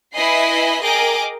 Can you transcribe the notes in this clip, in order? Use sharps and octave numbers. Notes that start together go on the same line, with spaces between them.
E4 B4 D#5 G#5 B5 C7
G#4 A#4 D#5 G5 D6